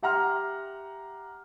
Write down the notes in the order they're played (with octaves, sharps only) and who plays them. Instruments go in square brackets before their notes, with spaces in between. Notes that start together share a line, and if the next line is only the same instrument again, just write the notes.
[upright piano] G4 E5 F#5 A#5 C6 F6